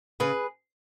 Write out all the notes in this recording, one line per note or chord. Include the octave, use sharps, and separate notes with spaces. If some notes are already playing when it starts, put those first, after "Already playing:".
C#3 G#4 B4